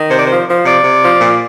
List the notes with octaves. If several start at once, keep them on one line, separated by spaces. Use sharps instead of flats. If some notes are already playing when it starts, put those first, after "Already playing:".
Already playing: D#3
C3 C5
D5
F3 C5
F3
C3 D5
C3
F3
A#2